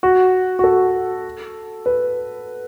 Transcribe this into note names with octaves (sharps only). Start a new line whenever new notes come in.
F#4
F#4
A4
B4